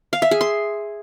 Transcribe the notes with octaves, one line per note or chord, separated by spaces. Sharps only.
F5
E5
G#4
C6